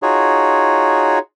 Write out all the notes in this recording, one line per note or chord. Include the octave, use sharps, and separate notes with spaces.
D#4 F4 F#4 G#4 C#5